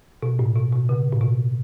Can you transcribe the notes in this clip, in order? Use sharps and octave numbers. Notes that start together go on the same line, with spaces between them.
B2
A2
B2
B2
C#3
A2
B2